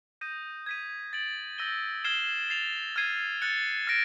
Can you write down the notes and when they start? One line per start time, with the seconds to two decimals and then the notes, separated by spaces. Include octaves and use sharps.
0.21 D#6 G6 A#6 D#7
0.66 G#6 B6 D#7
1.13 A6 D7 F#7
1.58 E6 G6 A#6 D#7 G7
2.04 F6 G#6 C7 E7 G7
2.50 A6 C7 F7
2.96 F6 G#6 C7 D#7
3.42 F#6 A6 C#7
3.87 F6 A#6 D7